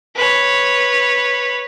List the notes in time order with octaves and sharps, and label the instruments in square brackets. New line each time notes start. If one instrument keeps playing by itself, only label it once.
[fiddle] B4 C#5